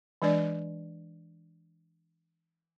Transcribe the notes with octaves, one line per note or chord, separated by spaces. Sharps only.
E3 G#3 D4 D5